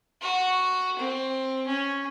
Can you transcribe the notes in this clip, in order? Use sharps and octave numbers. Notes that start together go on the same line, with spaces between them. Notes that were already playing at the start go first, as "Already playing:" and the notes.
F#4
C4
C#4